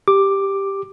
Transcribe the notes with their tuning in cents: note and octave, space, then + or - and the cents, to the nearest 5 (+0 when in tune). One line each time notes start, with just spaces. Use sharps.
G4 +0 D6 +5